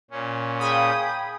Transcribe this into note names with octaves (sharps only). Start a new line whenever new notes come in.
A#2 C#4
G#4 F5 G5 G#5 B5 D#6